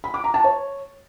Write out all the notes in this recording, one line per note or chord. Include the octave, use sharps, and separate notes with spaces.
B5
D6
A#5
A5
C#5